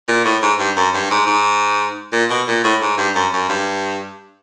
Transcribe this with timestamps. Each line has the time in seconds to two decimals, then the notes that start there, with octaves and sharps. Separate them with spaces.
0.08 A#2
0.25 A2
0.42 G#2
0.59 G2
0.76 F#2
0.94 G2
1.10 G#2
1.27 G#2
2.12 A#2
2.30 B2
2.48 A#2
2.64 A2
2.81 G#2
2.98 G2
3.15 F#2
3.33 F#2
3.49 G2